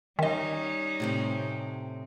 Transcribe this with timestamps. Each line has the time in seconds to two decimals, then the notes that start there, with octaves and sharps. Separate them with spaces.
0.19 D#3 G3 C#4 D#4 D#5
1.00 A2 C3 C4